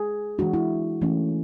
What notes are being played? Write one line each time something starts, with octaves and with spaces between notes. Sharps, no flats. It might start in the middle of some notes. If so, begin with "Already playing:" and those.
Already playing: G#4
E3 G#3 D4 F#4
E4
E3 A3 C#4